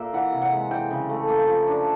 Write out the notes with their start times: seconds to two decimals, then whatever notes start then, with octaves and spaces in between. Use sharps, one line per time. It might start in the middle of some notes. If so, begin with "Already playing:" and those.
Already playing: A#2 A#3 E5
0.13 E3 F#5
0.32 C3
0.42 F#5
0.52 G#3
0.71 E3 G5
0.91 C#3
1.09 A3
1.29 A#3
1.47 F3
1.67 D4